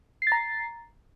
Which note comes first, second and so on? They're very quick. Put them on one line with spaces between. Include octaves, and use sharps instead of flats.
C7 A6 A#5